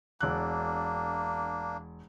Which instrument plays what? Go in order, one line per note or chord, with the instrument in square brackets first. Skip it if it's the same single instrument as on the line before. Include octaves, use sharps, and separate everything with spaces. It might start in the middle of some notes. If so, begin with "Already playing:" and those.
[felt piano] E1 F#6 [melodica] A#3 D4